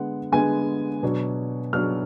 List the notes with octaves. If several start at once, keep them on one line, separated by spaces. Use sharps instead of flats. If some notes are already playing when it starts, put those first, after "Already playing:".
Already playing: D3 G#3 B3 F#5
D3 G#3 B3 G#5
B2 F#3 D4
B2 F#3 D4 F6